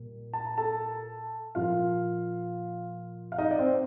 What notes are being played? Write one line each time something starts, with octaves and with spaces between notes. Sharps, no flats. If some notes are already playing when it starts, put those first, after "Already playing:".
Already playing: A#2 G3 A#3
A5
A#5
A4 A5
A#2 F3 A#3 F4 F5
F5
D#4 D#5
D5
C4 C5